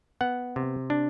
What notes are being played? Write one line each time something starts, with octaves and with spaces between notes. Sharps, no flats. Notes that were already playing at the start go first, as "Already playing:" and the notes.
B3 F#5
C3
D4